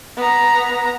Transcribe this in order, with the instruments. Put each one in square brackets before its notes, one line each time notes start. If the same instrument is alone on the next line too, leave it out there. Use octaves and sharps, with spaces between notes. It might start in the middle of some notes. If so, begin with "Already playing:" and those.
[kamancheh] B3 A#5